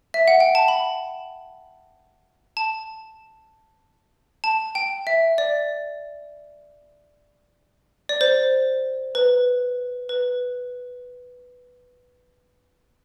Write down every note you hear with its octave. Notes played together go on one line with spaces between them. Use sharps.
E5
F#5
G5
A5
B5
A5
A5
G5
E5
D5
D5
C5
B4
B4